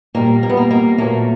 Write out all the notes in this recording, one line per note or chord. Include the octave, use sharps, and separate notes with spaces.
A#2 G3 A#3
A#3
B3
A#3
A#3
A#2 F#3 A3 A#3